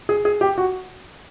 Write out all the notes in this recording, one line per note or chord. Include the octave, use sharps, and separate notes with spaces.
G#4
G#4
G4
F#4